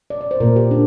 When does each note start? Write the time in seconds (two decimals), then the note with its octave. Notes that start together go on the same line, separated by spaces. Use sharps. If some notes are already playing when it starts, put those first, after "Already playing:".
0.10 D5
0.21 D5
0.31 C5
0.40 A#2 A#3 A#4
0.56 G4
0.71 D4